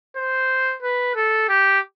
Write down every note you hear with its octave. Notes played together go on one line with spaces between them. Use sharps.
C5
B4
A4
G4